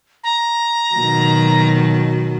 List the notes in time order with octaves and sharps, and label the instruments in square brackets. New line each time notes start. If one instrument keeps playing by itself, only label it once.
[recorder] A#5
[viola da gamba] B2 D#3 F#3